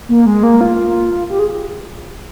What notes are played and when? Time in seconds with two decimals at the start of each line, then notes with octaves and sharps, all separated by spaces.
0.09 A#3
0.26 G#3
0.43 A#3
0.61 F4
1.30 G4
1.39 G#4